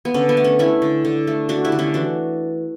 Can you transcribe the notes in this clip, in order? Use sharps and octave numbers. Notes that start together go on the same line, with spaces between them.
B3
D3 C#4
B3
A3
C#4
A3 C#4 E4
D3
D3
A3
A3 D4 F#4
E4 G4
D3
C#4 E4
E3 D4 F#4